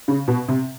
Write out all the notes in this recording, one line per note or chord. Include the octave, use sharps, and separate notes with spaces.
C#3
B2
C3